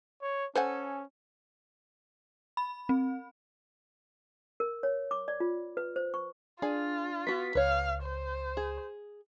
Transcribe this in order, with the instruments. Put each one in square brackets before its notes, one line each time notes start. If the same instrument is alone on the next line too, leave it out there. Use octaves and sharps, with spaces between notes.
[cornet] C#5
[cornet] C#4 [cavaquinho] A4 G#5 [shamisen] C5 F#5
[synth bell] B5
C4
[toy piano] A#4
C#5
D6
D5
F4
B4
C5
C#6
[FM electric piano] D4 [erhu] F4 [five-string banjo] G#4 G#5
[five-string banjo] B3 F#4 [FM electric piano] B6
[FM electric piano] C#2 [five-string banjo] B4 C#5 [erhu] F5
[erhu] C5
[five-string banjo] G#4